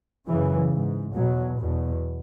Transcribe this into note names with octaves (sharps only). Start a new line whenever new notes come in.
F#2 C#3 E3
G#2
E2 B2 F#3
E2 B2